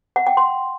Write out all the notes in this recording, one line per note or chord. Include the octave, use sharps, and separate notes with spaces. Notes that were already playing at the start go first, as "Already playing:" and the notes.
F#5
G5
C6